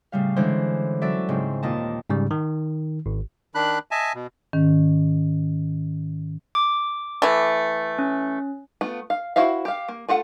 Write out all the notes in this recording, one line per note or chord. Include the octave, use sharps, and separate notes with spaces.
A2 C#3 G3 F5
D3 E3 G#3 C#4 D4 C5
F#3 C#4 E4 A4 D5 E5
G#2 C#3 C4
D#2 A#2 D#5 A5
G#2 C#3 G3
D#3
G#1
D#3 D4 B5 F#6
D#5 E5 G#5 A5
B2
G#2 D#3 C#4
D6
E3 A3
C#4
A3 B3 F4
F5
E4 F#4 C5 E5 F5
G4 F5
A#3
A3 F4 A4 F#5